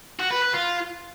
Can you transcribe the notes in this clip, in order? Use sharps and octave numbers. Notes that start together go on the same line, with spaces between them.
F#4
B4
B4
F4